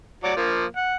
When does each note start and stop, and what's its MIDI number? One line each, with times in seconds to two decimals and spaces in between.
0.24 0.33 54
0.24 0.33 74
0.37 0.65 53
0.37 0.65 58
0.76 0.95 78